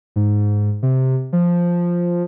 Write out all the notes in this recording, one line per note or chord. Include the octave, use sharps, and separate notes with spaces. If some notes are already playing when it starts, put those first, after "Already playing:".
G#2
C3
F3